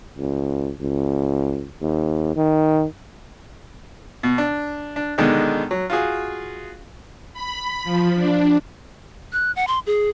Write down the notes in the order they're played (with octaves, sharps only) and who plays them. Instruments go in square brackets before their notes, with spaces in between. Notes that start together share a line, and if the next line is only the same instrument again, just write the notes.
[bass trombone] C#2
C#2
D#2
D#3
[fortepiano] B2
D4
D4
B2 D3 D#3 G#3 D4 D#4
F#3
F4 F#4 G#4
[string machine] B5
F3
D4
[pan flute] F#6
F#5
C6
G#4